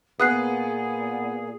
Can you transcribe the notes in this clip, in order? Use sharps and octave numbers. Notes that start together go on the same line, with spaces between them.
A#2 B3 G#4 D#6 F#6 C7